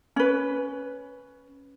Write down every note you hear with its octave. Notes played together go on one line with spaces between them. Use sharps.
C#4 B4